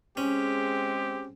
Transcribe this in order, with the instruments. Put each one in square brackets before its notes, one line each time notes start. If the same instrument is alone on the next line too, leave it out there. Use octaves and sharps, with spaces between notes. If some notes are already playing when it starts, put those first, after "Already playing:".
[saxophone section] G#3 C4 G#4 [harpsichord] C#4 [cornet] G4